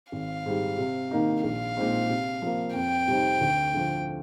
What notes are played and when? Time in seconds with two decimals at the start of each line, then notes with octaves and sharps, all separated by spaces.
0.12 G#1 F5
0.46 G#2 G3
0.78 C3
1.11 D#3 A#3 D#4
1.44 A#1 F5
1.76 A#2 G#3 C4 D#4
2.10 C3
2.42 F3 A#3
2.75 F2 G5
3.08 C3 G3 C4 D#4
3.41 D2
3.74 D3 F3